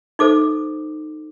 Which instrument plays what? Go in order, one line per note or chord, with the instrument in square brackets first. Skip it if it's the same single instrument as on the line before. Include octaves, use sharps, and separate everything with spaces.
[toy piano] D#4 A4 C5 D6